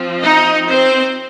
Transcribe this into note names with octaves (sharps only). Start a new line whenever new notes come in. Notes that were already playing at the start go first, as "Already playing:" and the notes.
Already playing: F3 C4
D#4 D#5
C4 C5